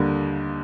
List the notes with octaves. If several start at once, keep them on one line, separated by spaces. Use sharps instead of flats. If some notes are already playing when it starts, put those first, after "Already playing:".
Already playing: D#2 D3 G3 A#3